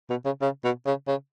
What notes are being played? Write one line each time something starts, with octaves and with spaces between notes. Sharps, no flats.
B2
C#3
C#3
B2
C#3
C#3